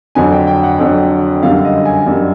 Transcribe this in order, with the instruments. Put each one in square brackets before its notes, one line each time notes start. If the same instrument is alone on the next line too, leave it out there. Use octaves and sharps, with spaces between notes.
[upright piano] F2 D3 F#3 G#5
G5
G5
F#5
F2 D3 F#3 G5
F#2 D3 G3 F5
D#5
G#5
F#2 D3 G3